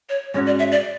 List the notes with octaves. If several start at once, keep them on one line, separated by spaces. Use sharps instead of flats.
C#5
G#2 G#3 C#4 F#4 C#5
D5
E5
D5